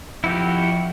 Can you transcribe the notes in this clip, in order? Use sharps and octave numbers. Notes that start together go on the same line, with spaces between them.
F2 F3 E4 F#4 G4